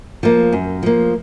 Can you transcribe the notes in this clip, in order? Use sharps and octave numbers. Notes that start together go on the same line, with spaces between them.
F3 A#3
F#2
F3 A#3